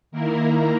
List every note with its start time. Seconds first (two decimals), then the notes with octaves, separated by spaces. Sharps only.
0.11 D#3 A#3 E4 A#4